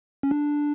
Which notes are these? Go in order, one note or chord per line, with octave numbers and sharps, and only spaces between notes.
C#4
D4